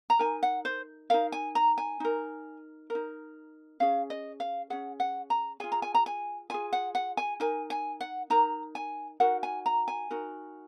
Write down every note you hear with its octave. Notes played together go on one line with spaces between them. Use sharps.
A#5
D#4 A#4 G#5
F#5
C5
D#4 A#4 F5
G#5
A#5
G#5
D#4 A#4
A#4
D#4
C#4 G#4 F5
D#5
F5
C#4 G#4 F#5
F#5
A#5
F4 G#4 G#5
A#5
G#5
A#5
G#5
F4 G#4 G#5
F#5
F#5
G#5
D#4 A#4 G#5
G#5
F#5
D#4 A#4 A#5
G#5
D#4 F#4 A#4 F#5
G#5
A#5
G#5
D#4 F#4 A#4